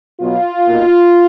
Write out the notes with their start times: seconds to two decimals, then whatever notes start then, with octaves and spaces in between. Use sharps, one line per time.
0.20 B2 F#3 B3 F4
0.67 B2 A#3 D#4